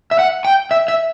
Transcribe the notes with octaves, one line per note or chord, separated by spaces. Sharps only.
E5
F#5
G5
E5
E5